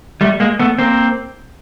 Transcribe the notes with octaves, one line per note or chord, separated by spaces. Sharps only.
G3 A3
G#3 A#3
A3 B3
A#3 C4